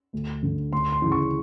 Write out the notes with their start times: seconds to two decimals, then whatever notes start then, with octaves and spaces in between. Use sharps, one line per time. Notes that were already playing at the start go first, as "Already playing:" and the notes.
0.13 D2
0.43 D3
0.72 D2 C6
0.92 C6
1.02 C#3 E3
1.12 C#6